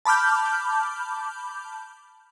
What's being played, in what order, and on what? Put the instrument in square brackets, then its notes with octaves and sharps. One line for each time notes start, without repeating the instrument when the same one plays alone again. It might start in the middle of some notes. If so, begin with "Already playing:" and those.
[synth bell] A5 B5 D6 F6 G6